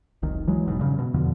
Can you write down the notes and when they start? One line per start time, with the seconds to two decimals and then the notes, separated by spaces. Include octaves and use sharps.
0.22 F1 C2 D#3
0.47 E3 F#3 G#3
0.66 F1 G#2 B2
0.79 G2 C#3
0.99 B2
1.14 E2 B2 D3 F3